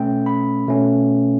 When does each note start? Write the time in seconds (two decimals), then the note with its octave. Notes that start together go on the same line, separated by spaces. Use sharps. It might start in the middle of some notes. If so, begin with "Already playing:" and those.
Already playing: B2 A3 C#4 G5
0.26 B5
0.68 B2 A3 C#4